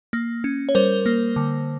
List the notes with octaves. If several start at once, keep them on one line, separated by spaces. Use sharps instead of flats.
A#3
C#4
C#5
G3 A#4 C5
A#3
D3